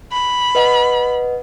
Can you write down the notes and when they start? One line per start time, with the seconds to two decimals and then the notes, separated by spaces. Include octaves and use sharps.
0.12 B5
0.55 B4 D#5 F#5